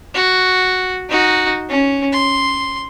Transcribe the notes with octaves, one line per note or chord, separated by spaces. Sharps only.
F#4
D#4 F#4
C#4
C6